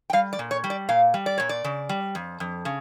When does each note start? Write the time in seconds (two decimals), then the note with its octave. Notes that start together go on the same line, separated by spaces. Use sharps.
0.10 G5
0.13 G3 F5
0.33 D5
0.39 A#2
0.51 C#5
0.64 G3
0.70 D5
0.89 A#2 F5
1.14 G3
1.26 D5
1.38 A#2 C#5
1.49 D5
1.64 C#3
1.89 G3
2.15 F2
2.40 F2
2.65 C#3